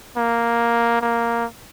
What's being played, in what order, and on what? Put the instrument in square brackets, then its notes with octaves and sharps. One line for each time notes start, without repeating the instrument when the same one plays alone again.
[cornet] A#3
A#3